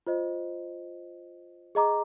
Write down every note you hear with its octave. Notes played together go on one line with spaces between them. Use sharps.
F4 C5 D#5
G#4 D#5 A#5 D6